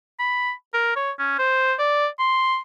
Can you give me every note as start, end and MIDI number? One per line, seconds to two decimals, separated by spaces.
0.19 0.52 83
0.74 0.95 70
0.96 1.11 73
1.19 1.34 61
1.39 1.74 72
1.79 2.07 74
2.19 2.58 84